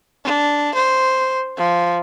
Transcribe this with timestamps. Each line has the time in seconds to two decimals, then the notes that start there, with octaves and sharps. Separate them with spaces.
0.25 D4
0.75 C5
1.57 F3